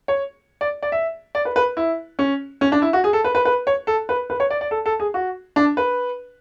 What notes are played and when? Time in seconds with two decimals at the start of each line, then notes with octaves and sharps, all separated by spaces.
0.08 C#5
0.61 D5
0.82 D5
0.92 E5
1.35 D5
1.45 B4
1.56 B4
1.77 E4
2.19 C#4
2.61 C#4
2.72 D4
2.82 E4
2.93 F#4
3.04 G#4
3.13 A4
3.24 B4
3.35 B4
3.45 B4
3.67 C#5
3.87 A4
4.09 B4
4.30 B4
4.40 C#5
4.50 D5
4.61 D5
4.71 A4
4.86 A4
5.00 G#4
5.14 F#4
5.56 D4
5.77 B4